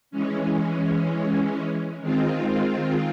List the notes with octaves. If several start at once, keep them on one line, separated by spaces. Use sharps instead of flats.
E3 G#3 C#4
D#3 G#3 C4 F4